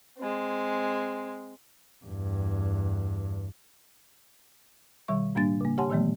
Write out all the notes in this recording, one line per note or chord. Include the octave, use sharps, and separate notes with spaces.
G#3 C4
E2 G2
B2 D#3 G3 E5 C#6
A2 G3 A#3 D4 A6
C#3 A#3
G4 C#5 F#5 G#5 A5 C6
A#2 D#3 E3 F#3 A3 B3